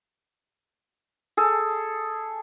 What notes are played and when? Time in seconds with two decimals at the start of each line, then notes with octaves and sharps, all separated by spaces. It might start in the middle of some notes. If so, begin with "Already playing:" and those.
1.37 G#4 A4